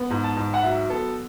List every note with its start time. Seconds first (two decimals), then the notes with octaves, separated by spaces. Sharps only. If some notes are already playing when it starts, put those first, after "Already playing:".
Already playing: B3
0.10 G#2
0.24 A5
0.36 G#2
0.54 F#5
0.63 F#3 E5
0.89 B3 A4